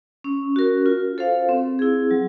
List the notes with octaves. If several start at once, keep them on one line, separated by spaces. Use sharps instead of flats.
C#4
F#4 A#4
F4
A4 C5 F5
C4
E4 G#4
F#3